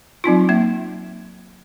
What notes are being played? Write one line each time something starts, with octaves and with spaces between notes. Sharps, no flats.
F#3 C4 D#4 F4
A#3 E5